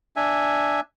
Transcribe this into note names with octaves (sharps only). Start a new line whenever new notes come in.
D4 E5 G#5